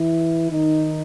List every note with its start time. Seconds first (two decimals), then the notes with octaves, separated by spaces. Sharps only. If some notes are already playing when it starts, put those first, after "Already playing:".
Already playing: E3 E4
0.51 D#3 D#4